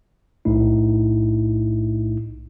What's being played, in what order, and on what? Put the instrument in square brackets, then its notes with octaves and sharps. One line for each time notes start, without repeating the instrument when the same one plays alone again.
[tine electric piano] B1 A2 A3 D#4 E4